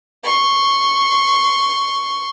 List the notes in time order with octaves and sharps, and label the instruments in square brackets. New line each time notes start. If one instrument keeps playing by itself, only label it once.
[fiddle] C6 C#6